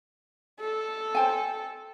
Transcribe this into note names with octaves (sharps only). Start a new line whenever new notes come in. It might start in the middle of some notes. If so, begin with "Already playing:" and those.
A4
C5 G5 G#5